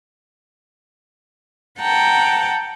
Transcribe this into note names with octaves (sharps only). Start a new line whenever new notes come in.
F#5 G5 A5 A#5